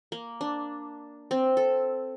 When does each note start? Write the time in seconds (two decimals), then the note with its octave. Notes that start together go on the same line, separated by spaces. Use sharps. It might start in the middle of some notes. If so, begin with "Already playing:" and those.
0.12 A#3
0.41 D4
1.31 C4
1.57 A4